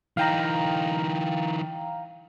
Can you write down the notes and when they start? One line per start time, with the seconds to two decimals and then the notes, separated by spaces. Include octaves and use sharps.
0.17 E3 D#4 F5 G5 A#5